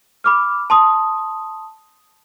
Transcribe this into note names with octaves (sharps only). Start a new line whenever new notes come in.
B5 D6 F6
A5 C6 D#6